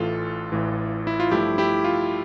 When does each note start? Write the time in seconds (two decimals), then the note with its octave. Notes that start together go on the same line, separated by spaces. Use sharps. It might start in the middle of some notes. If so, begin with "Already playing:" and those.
Already playing: A1 A2 E3 F4 A4
0.52 A1 A2 E3
1.07 E4
1.20 F4
1.31 G2 F3 A3 E4 G4
1.58 E4 G4
1.84 F4